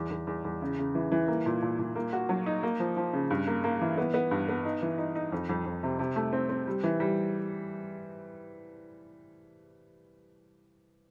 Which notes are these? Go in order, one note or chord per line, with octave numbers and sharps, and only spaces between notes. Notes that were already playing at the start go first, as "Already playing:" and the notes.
Already playing: E2
E2
E2
E2
C#3
C#3
E3
E3
A#3
A#2
A#2
A#2
A#3
F#4
F#3
D#4
A#3
F3
F3
C#3
G2
A#3
A#3
E3
B3
B3
G2
B3
D#4
E3
D#4
D#4
F2
F2
F2
C3
C3
A3
C4
C4
G3
E3
G3